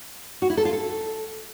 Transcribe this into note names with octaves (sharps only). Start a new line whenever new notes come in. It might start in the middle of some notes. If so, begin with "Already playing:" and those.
F#4
E4
A4
F4
A4